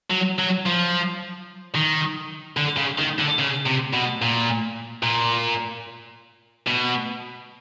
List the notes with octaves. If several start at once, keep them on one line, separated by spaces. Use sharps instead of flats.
F#3
F#3
F3
D#3
D3
C#3
D#3
D3
C#3
C3
B2
A#2
A#2
B2